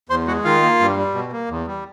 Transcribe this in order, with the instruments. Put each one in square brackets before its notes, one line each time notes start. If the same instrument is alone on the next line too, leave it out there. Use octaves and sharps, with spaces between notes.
[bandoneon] E2 C5 C6
G#3 F#4 F#5
D#3 F4 F5
A#3
G2
G3
B2
A#3
E2
G3